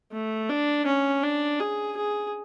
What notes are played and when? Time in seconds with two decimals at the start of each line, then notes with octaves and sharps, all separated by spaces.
0.12 A3
0.49 D4
0.86 C#4
1.23 D4
1.60 G#4
1.97 G#4